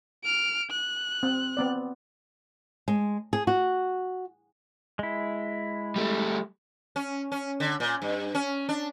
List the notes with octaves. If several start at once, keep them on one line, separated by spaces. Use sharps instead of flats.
F6 D7
F#6
C4
B3 C4 D5
G#3
G#4
F#4
G#3 E4
G3 A3
C#4
C#4
D3
A#2
G2
C#4
D4